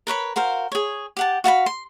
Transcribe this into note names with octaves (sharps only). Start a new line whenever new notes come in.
A#4 B4 C#5 B5
F#4 A#4 C5 F5
G#4 C#5
G4 F#5 A5
F#4 F5 A5 B5
C6